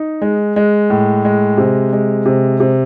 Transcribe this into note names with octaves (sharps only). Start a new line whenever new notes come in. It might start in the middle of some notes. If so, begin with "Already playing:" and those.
Already playing: D#4
G#3
G#3
A2
G#3
C3
G#3
C3
C3